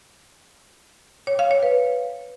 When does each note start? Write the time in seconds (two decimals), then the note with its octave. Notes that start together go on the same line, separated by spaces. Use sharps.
1.27 C#5
1.39 F5
1.51 C#5
1.63 B4